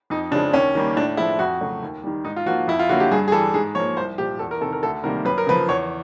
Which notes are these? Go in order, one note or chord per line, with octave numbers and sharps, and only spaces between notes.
F2 D#4
C#3 F3 G#3 D4
D#2 C#4
D#3 G3 A#3
A2 D4
F3 G#3 E4
F2 F#4
C#3 F#3 A3
D#2
D#3 G3
G#2 D#4
F4
F3 A#3 F#4
F2 E4
F4
D3 F#3 A#3 F#4
G4
G2 G#4
G#4
E3 G3 A4
G#2 G#4
F3 A#3 C#5
C2 C5
A#2 F3 G4
E2 A4
A#4
C3 D#3 A4
A#4
D2 A4
C3 D#3 G3 A#3 A#4
F#2 B4
A#4
C#3 F3 B4
E2 C#5